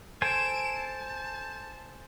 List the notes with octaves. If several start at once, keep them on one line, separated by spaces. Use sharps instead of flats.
A4 C5 G#5 D7 E7
A5